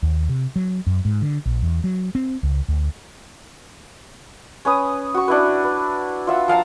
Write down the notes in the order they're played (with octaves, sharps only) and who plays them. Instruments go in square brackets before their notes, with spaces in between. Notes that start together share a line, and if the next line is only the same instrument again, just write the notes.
[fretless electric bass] D#2
C3
F#3
F#2
G#2
D3
A#1
E2
F#3
C4
C#2
D2
[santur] C#4 B4 D#6
F#4 C#6
D4 E4 B4
B4
F4 E5 F#5
F3 F5 A5 A#5